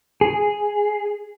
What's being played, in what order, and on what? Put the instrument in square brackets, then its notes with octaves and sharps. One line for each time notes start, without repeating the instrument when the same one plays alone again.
[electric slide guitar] G#4